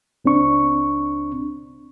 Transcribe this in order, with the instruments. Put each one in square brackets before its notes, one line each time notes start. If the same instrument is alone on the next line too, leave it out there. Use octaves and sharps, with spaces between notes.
[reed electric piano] C#2 C4 D4 C#6